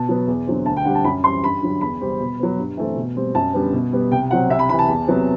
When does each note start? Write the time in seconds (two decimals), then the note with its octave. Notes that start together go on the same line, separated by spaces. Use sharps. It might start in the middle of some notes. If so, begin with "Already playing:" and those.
Already playing: B2 A5
0.09 F#3 B3
0.27 E2
0.47 D3 F#3 C4
0.66 D2 A5
0.77 G5
0.85 D3 G3 C4 F#5
0.95 A5
1.04 F#2 B5
1.24 E3 G3 C4 C6
1.43 G2 B5
1.62 D3 F#3
1.81 E2 B5
2.01 C3 G3 C4
2.19 B2
2.39 F#3 B3
2.58 G2
2.77 E3 A3 C4
2.97 B2
3.16 G3 C4
3.35 F#2 A5
3.53 D3 G3 B3
3.73 B2
3.93 G3 B3
4.11 C2 G5
4.31 C3 F#3 C4 F#5
4.49 C2 E5
4.59 B5
4.69 C3 E3 B5
4.79 A5
4.88 E2
5.08 C3 F#3 B3